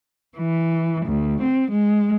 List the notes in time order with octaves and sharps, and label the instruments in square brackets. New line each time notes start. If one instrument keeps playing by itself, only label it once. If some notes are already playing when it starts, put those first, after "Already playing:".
[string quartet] E3
D2
C4
G#3